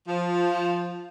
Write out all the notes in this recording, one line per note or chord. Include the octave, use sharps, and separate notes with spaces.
F3